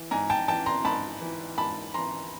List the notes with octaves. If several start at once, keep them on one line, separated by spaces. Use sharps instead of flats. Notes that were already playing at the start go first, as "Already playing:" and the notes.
Already playing: E3
G#2 G#5 A#5
G5 A5
E3 G5 A5
A#5 C6
G#2 A5 B5
E3
G#2 A5 B5
E3 A#5 C6